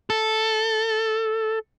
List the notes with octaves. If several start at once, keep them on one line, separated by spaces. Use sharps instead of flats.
A4